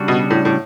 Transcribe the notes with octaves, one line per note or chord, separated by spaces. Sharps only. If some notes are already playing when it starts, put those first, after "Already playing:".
Already playing: C#3 G3 D4 F#4
B2
A2
A2